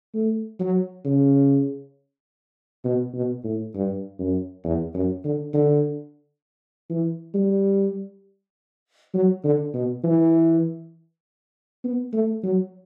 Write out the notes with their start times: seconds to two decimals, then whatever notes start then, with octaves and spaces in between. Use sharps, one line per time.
0.14 A3
0.60 F#3
1.05 C#3
2.84 B2
3.14 B2
3.44 A2
3.75 G2
4.19 F#2
4.64 E2
4.94 F#2
5.24 D3
5.54 D3
6.90 E3
7.34 G3
9.14 F#3
9.44 D3
9.74 B2
10.04 E3
11.84 B3
12.13 A3
12.44 F#3